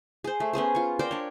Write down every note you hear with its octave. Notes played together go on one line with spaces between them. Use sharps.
G#4 C5
A3
B3 C#4 G#4 C5
F4 C#6
A#4 C5 D5 G5
D4 C#5